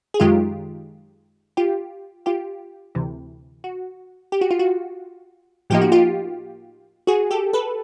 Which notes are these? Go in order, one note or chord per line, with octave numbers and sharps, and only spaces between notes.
G#4
F#2 D#3 G#3 F4 G4
F4 G4
F4 G4
D2 C3 E3
F#4
G4
F#4
F4
F#4
A2 F3 A#3 D#4 G4
F#4
F4 G4
F#4 G#4
G4 A4
A4 B4